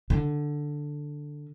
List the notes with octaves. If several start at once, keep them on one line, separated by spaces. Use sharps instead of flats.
D3